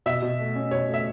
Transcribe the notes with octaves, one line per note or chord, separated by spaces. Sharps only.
B2 E5
B2
A3
C#4
B2 C#5
A3
E5